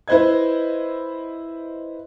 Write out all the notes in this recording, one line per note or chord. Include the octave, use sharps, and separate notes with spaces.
E4 B4 C5 D#5 G#6